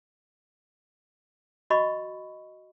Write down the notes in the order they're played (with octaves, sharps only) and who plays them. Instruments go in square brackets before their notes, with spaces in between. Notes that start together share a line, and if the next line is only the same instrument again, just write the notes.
[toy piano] F#4 D#5 B5 C#6